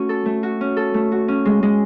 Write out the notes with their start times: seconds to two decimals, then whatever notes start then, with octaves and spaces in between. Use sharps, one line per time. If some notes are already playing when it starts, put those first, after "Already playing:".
Already playing: A3 C#4 F#4
0.09 A4
0.26 A3
0.43 F#4
0.61 C#4
0.77 A4
0.94 A3
1.12 F#4
1.28 C#4
1.45 G#3
1.63 G#3